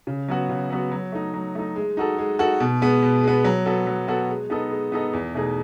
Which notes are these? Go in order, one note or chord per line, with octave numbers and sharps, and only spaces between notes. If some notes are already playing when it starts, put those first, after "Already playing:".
C#3
F#3 B3 F#4
C#3
F#3 B3 F#4
F#3
A3 D#4
F#3
A3 D#4
G#3
D#4 F#4 A4
G#3
D#4 F#4 A4
B2
G#3 B3
B2
G#3 B3
F#3
B3 F#4 A4
F#3
B3 F#4 A4
G#3
B3 D#4 A4 D#5
G#3
B3 D#4 A4 D#5
E2
B2 A3 D#4 G#4